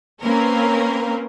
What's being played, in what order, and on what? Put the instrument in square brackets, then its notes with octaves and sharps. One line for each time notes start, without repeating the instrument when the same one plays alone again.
[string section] A#3 C4 C#4 A#4 B4